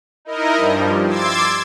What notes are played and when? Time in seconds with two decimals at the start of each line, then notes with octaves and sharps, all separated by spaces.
0.25 D#4 E4 A#4 D#5
0.56 G2 F3 G3
1.07 C6 D6 E6 G#6 A6